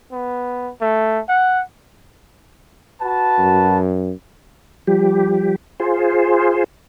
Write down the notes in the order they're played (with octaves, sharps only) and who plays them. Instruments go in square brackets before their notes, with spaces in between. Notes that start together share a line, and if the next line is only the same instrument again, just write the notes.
[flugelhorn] B3
A3
F#5
[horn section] F#4 B4 A5
[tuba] F#2
[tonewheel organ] F3 G3 G4
F4 G#4 C5